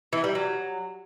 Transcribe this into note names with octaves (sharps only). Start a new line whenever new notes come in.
E3
G3
F#3